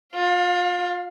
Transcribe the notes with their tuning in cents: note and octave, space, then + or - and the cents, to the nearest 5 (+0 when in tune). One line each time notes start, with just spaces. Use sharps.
F4 +30 F5 +0